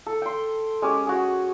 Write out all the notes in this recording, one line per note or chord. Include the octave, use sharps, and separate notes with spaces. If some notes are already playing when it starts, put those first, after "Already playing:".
A4
G5 C6
G#3 C#4 G4
F#4 G#4